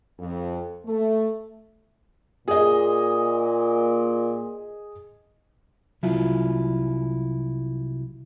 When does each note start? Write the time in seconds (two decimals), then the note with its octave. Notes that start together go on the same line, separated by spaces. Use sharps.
0.19 F2
0.86 A3
2.48 A#2 G#4 D#5
6.03 C2 F#3 E4 F4